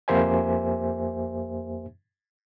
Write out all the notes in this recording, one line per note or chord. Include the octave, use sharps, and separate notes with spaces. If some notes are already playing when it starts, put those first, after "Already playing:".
F2 A#3 G4 C5 E5 G#5